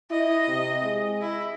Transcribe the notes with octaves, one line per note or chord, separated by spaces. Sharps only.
E4 D#5
C3
G#3
E4